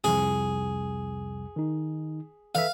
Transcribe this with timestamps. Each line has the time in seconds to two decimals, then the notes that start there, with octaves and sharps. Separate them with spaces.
0.04 C2 F2 G#4
1.56 D#3 D#4
2.55 A4 B4 E5 F5